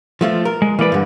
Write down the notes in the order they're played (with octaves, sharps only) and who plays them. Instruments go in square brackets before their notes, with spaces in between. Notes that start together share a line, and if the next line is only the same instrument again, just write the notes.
[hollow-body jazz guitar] F3 A3 F4
A#4
[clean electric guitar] G#3
[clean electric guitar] E3 D5 [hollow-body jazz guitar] A#3 B4
[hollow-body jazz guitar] G2 D3